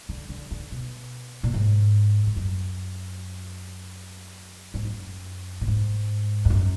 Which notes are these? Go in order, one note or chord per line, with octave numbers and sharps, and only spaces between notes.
D3
D3
D3
B2
A#2
G#2
G#2
F#2
G#2
F#2
A#2
G#2
F2
F#2